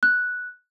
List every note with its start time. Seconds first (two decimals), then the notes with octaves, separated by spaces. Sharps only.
0.03 F#6